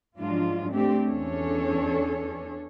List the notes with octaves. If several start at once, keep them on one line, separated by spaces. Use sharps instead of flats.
G#2 F3 F#3 D4 F4
A3 C4 D4 G4
E2 C#4 D4 A4 C#5